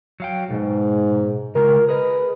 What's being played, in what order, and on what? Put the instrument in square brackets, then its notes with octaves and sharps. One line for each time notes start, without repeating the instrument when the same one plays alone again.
[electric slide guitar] F#3 F5 G5
[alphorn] G#2 [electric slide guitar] B2
[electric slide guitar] C#3 G#3 F4 [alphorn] A#4
[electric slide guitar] G#4 A#4 D#5 [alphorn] B4